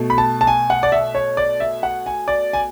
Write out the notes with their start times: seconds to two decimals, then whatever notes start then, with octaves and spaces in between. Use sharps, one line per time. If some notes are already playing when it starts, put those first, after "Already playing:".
Already playing: B2 A3
0.10 B5
0.18 A5
0.41 A5
0.47 G#5
0.70 F#5
0.83 D5
0.92 E5
1.15 C#5
1.37 D5
1.60 E5
1.83 F#5
2.06 G#5
2.28 D5
2.53 G#5